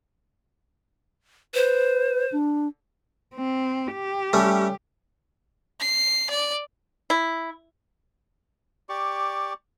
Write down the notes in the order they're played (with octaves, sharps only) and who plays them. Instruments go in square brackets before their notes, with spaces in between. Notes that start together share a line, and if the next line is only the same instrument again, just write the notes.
[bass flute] B4 [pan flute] C5
[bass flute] D4
[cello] C4
G4
[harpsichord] G3 A3 C#4
[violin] C7
D5
[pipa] E4
[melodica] G4 D5 C#6